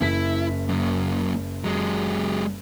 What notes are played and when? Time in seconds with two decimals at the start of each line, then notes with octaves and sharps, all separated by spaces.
0.01 F#1 E4 E5 B6
0.69 F#2 A#3
1.64 F#3 G#3